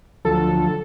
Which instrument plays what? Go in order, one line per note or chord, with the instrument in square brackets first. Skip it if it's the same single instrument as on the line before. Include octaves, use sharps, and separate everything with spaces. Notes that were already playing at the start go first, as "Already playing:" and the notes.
[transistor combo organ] D2 F3 F#3 [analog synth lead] A4